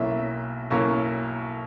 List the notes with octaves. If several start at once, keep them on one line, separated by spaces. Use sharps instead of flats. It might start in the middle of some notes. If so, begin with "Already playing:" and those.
Already playing: B1 B2 A#3 C#4 E4 E5
B1 B2 A#3 C#4 E4